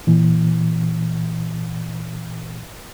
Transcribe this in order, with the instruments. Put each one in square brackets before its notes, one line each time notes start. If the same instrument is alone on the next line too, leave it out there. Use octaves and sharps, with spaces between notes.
[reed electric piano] A#2 E3